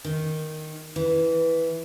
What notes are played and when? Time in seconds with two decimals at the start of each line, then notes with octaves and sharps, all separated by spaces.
0.04 D#3
0.96 E3